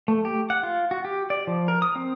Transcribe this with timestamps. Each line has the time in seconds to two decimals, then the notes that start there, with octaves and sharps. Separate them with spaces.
0.08 A3
0.25 G4
0.50 F#5
0.63 F4
0.91 F#4
1.05 G4
1.30 D5
1.47 F3
1.68 A#4
1.82 D#6
1.96 C4